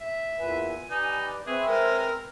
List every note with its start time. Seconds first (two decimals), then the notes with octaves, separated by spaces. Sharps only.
0.01 E5
0.39 E2 A#2 B4 G#5
0.90 D#4 G4 B4 D5
1.47 C4 G#4 B4 E5 C#6
1.66 G#3 A#4